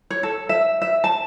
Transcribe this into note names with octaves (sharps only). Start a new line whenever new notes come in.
C#5
A4
E5
E5
A5